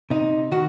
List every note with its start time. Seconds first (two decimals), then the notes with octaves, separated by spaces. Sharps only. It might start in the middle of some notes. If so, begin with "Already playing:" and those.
0.10 C3 D#4
0.51 D#3 F#4